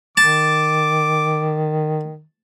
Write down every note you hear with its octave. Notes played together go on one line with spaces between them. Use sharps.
D#3 A5 D6